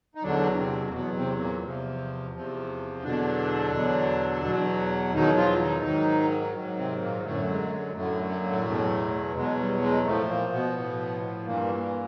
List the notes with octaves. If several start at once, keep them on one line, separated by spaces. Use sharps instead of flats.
D#4
E2 B2 D3 F#3 D4
C3 C4
A#3
E2 B2 F#3 B3
C3 C4
A#2 A#3
E2 C3 F3
E2 C3 F3
E2 B2 D3 F#3 D4
E2 B2 F#3
E2 B2 F#3
E2 B2 D#3 F#3 D#4
F3 F4
D#3 D#4
G#2 D#3 F#3
G#2 D#3 F#3
C3 C4
A#2 A#3
F#2 A2 D3 F#3 A3
G#3
A3
G#3
F#2 A2 D3 F#3 A3
A3
A#3
A2 A3
E2 B2 F#3
E2 B2 F#3 G#3
G3
G#3
A2 F3 A3
A#2 A#3
B2 B3
A2 F3
G2 A#2 E3 A#3
A#2 A#3